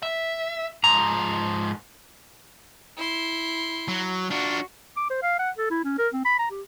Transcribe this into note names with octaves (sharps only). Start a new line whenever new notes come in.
E5
G#2 F3 A#5
E4 C6
F#3
D4 F4 F#4
D6
C5
F5
F#5
A4
E4
C#4
A#4
C4
B5
A#5
G4